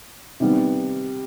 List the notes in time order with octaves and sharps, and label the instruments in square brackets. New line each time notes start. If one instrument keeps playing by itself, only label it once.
[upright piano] C3 D#3 G3 B3